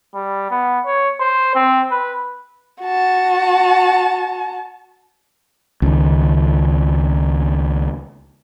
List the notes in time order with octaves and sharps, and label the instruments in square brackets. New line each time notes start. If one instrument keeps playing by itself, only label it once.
[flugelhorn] G3
B3
C#5
C5
C4
B4
[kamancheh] F#4 A5
[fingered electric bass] C#2 D#3